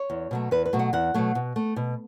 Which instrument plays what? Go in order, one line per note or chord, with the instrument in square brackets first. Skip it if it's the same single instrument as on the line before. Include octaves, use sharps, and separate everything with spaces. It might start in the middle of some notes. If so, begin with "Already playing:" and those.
Already playing: [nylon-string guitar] C#5
E2
B2 F#3 A3
E2 B4
B4
B2 F#3 A3
F#5
E2 F#5
B2 F#3 A3
B2
A3
B2